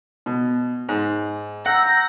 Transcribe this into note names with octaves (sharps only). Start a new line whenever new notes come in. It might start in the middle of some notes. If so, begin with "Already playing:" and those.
B2
G#2
F#5 A#5 E6 G6 A#6